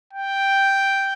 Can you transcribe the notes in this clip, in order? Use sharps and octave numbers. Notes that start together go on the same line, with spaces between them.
G5